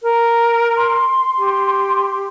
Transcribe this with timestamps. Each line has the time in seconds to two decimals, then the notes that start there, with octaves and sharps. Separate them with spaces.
0.03 A#4
0.76 C6
1.38 G4